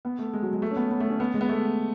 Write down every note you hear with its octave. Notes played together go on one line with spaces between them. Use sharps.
B3
A3
G#3
F#3
G#3
A3
C#4
B3
B3
A3
C#4
B3
G#3
B3
A3